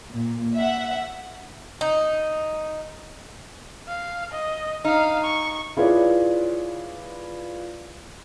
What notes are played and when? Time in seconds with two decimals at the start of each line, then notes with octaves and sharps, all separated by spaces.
0.10 A#2
0.56 E5 F#5
1.81 D#4
3.88 F5
4.32 D#5
4.85 D#4 F5
5.24 C#6
5.77 E4 F4 G#4 B4 C#5 D5